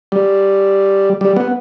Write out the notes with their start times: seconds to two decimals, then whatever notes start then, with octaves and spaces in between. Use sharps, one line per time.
0.12 G3
1.21 G3
1.36 B3